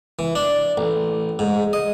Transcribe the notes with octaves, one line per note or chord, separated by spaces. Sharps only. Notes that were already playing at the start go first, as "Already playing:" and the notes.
E3
D4
A1
G#2
D#5